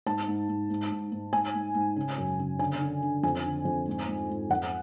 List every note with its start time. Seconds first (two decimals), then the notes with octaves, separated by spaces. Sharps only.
0.06 G#2 A5
0.28 G#2
0.49 G#2
0.70 G#2
0.91 G#2
1.12 G#2
1.33 G#2 G#5
1.55 G#2
1.75 G#2
1.96 C#3
2.18 F#2
2.39 C#3
2.59 D3 G#5
2.81 D3
3.02 D3
3.23 F2 G#5
3.45 D3
3.65 F2
3.88 G#2
4.07 G#2
4.30 G#2
4.50 F2 F#5